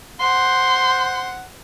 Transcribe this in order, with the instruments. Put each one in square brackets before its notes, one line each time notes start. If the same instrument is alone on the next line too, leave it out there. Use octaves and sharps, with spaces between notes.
[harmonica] C5 F#5 [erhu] C6